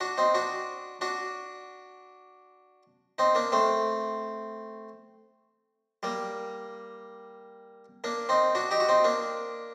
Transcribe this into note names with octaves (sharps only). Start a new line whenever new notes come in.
D4 F#4
C4 D#4
D4 F#4
D4 F#4
C4 D#4
A#3 D4
A3 C4
G3 A#3
A#3 D4
C4 D#4
D4 F#4
D#4 G4
F#4
C4 D#4
A#3 D4